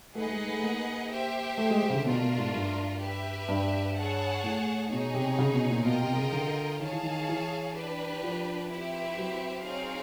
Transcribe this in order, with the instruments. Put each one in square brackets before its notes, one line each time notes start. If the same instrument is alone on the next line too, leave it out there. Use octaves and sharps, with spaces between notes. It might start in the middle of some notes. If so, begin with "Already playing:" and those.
[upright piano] A3 [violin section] D#4 G#4 B4 D#5 F#5
[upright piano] A3
G#3
A3
A#3
[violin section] G4 C5 E5 G5
[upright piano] A3
G#3
G3
C#3
D3
[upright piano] B2 [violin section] A3 D4 F4 A#4
[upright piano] B2
G#2
G2
[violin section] G4 B4 E5
[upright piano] G2
[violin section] G#4 C#5 F#5 A5
[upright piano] A2
[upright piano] B2 [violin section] D#4 G#4 C#5
[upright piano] C3
C#3
B2
A#2
[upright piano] B2 [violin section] F4 A#4 D#5 G5
[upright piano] C3
C#3
D3
[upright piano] D#3 [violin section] G#4 C#5 F5 A5
[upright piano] E3
D#3
E3
[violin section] D4 G4 B4
[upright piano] F3
[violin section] C4 E4 G4 B4 E5
[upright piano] F#3
[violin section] C4 D#4 G#4 C#5 F5